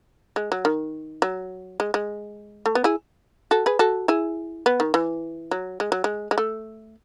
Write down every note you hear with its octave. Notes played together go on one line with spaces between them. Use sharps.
G#3
F#3
D#3
F#3
G#3
G#3
A3
B3
E4 G#4
F#4 A4
G#4 B4
F#4 A4
E4 G#4
B3
D#3
E3
F#3
G#3
F#3
G#3
G#3
A3